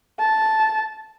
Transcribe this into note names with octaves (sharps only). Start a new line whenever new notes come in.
A5